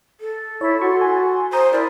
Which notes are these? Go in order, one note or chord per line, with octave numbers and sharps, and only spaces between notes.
A4
E4 C#5
F#4 C6 C#6
G#5
C5 A#5 D#6 G6
E4 A#4 D5